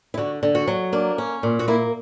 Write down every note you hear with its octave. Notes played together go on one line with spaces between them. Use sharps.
E4
D3 F#4
D3
F#4
F#3
A#3 D4
C#4
A#2
F#4
A#3 E4